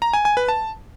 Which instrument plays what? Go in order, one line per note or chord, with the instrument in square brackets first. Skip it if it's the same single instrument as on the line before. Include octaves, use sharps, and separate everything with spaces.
[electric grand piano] A#5
G#5
G#5
B4
A5